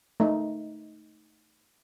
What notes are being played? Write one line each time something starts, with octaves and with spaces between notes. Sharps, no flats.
A3 D#4